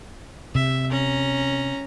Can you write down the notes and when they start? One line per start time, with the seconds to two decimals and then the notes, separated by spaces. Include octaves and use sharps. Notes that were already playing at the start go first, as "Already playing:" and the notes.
0.55 C3 E5
0.91 C#4 A#5